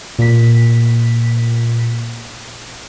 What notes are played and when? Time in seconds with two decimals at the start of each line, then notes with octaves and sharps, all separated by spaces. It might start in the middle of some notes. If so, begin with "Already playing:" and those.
0.19 A#2 B6